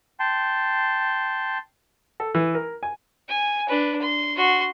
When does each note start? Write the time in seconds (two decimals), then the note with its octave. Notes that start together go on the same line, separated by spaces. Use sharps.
0.20 G5 A5 C6
2.20 A4
2.35 E3
2.55 A#4
2.83 G#5
3.28 G#5
3.68 D4 B4
4.01 C6
4.36 F#4 C6